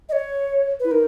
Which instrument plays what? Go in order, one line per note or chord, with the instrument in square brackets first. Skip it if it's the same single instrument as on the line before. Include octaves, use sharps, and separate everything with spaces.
[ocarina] D#5
C#5
[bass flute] E4 [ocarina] B4
[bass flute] D#4 [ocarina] A#4